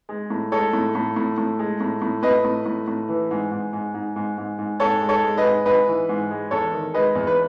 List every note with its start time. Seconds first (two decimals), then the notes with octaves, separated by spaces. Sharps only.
0.09 G#3
0.30 A2
0.52 G#3 A4 C#5
0.73 A2
0.95 A2
1.16 A2
1.38 A2
1.59 G#3
1.81 A2
2.02 A2
2.23 A2 B4 D#5
2.44 A2
2.66 A2
2.87 A2
3.08 E3
3.31 G#2
3.51 G#2
3.73 G#2
3.94 G#2
4.16 G#2
4.38 G#2
4.59 G#2
4.80 G#2 A4 C#5
5.02 G#3
5.09 A4 C#5
5.23 G#3
5.37 B4 D#5
5.44 G#2
5.66 G#2 B4 D#5
5.88 E3
6.09 G#2
6.31 G#3
6.51 E2 A4 C#5
6.73 D#3
6.94 G#3 B4 D#5
7.15 E2
7.27 B4